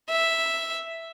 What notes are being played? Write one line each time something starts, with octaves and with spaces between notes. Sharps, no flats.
E5